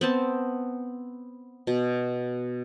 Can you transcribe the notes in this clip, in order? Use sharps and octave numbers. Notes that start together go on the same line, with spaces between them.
B3 C4 A5
B2